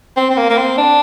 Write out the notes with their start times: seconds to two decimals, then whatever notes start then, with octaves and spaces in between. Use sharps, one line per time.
0.16 C4
0.30 C4
0.37 A#3
0.50 A#3
0.57 C4
0.78 D4